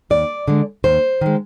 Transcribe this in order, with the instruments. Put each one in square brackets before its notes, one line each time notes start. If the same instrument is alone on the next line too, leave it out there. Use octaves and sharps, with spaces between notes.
[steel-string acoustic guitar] D#2 D5
D3 G#3
D#2 C5
D#3 G#3